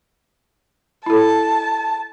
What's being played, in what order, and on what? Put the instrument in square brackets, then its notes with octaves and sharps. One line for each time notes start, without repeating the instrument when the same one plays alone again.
[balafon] E4 A4 [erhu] A5